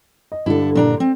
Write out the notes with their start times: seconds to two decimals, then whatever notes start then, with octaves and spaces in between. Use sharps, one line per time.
0.32 D#5
0.46 G2 D3 E4 A4
0.75 A#2 D4 A#5
1.00 C4